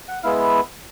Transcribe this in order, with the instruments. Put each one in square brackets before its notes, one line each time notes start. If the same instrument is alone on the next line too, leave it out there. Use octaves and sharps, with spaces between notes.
[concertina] F#5
G#3 B3 E4 F5